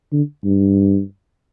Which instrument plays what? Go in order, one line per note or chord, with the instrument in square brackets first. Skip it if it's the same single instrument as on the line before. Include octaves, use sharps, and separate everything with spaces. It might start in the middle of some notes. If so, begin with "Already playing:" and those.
[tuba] D3
G2